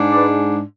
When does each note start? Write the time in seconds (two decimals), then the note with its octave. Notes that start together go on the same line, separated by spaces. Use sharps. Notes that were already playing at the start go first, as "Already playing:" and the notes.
Already playing: G#2 G#3 D4
0.12 B4 D5